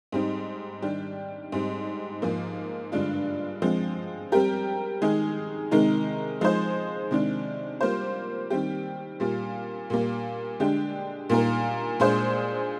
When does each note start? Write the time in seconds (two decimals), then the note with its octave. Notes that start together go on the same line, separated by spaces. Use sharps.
0.12 G#2 G3 C4 D#4
0.82 D#3 G3 D4 G4
1.52 G#2 G3 C4
2.22 G#2 F3 A#3
2.92 G2 D3 G#3 D4 F4
3.62 F3 G#3 C4
4.32 G3 C4 G4 A#4
5.02 D#3 G#3 D#4 G#4
5.71 C3 D#3 G#3 D#4 A#4
6.41 F3 G#3 D#4 G#4 C5
7.11 C3 D#3 G#3 D4
7.81 G3 A#3 F4 C5
8.50 D#3 G3 C4 G4
9.20 A#2 G3 A#3 F4
9.90 A#2 G3 A#3
10.60 D3 G#3 D4 G4
11.30 A#2 G3 A#3 D#4 A#4
12.00 A#2 G#3 D4 G#4 C5